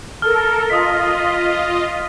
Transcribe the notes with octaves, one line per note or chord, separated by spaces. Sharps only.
A4 A#4 F6
F4 D#5 D#6 B6